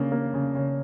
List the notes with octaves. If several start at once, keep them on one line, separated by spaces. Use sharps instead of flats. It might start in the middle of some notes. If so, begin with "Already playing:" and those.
Already playing: C#3 A#3 D4
A#3
C#3
C#3